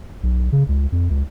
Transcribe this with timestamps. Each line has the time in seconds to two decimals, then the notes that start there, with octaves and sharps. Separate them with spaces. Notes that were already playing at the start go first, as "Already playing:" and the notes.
0.23 B1
0.52 C#3
0.69 C#2
0.92 F2
1.10 C#2